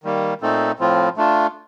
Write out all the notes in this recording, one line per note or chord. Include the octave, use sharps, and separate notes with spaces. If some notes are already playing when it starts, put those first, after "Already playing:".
D#3 G3 A#3
A#2 A3 C4 D#4 A4
A2 F3 C4 F4
A3 D4 F4